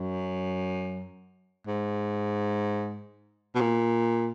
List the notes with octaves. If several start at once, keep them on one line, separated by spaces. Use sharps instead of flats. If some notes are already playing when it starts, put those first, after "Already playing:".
Already playing: F#2
G#2
B2
A#2